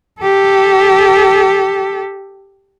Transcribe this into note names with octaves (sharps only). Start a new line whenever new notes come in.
G4 A4